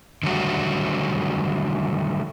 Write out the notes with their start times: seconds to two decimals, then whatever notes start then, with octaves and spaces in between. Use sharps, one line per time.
0.23 D3 D#3 F#3 G3 A3 F#4